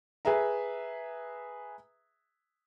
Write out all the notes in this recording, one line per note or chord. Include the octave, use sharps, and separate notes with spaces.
G#4 B4 E5 A#5